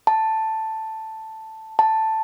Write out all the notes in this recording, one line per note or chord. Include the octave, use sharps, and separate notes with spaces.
A5
A5